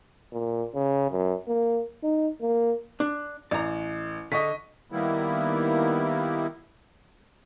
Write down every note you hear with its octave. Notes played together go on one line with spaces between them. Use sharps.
A#2
C#3
F#2
A#3
D#4
A#3
D4
A1 D5 A#5
D3 D#5 C#6 B6
D#3 G3 A#3 B3 E4